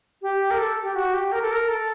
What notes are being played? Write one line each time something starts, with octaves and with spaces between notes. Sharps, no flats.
G4
A#4
A4
G4
F#4
G4
A#4
A4
A#4
A4